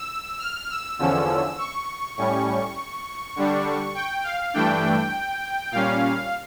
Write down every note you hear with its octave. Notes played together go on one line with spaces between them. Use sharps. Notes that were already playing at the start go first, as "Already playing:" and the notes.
Already playing: E6
F6
E6
E2 D3 F3 C#4 E6
C#6
A2 G3 C#4 C#6
D3 G3 D4
G5
F5
G2 E3 A3 D4 G5
A#2 G3 C#4 F5